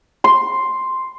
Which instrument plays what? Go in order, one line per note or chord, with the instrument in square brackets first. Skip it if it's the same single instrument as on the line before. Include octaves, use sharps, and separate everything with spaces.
[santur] C6